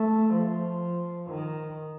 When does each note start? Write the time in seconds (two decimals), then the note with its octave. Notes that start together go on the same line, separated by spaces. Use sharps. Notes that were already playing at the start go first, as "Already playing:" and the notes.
Already playing: A3
0.33 F3
1.29 D#3